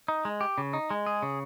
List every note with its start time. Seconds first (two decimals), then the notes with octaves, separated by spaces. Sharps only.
0.08 D#4
0.25 G#3
0.41 G4
0.58 C#3
0.73 D#4
0.91 G#3
1.06 G#4
1.22 C#3